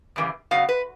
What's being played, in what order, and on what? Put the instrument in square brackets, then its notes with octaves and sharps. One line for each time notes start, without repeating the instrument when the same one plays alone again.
[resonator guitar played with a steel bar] F#2 C#3 E3 G3 A#3
C#3 F#3 B3 F5
B4